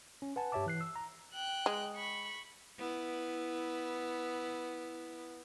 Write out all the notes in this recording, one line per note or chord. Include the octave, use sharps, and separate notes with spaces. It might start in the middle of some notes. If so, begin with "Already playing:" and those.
C#4
B4 F#5 G#5 A5
G2 G4 C#5 E5 A5 D6
E3 F#6 C7
E6
A#5
G5 F#6
G#3
B5 C#6
B3 E4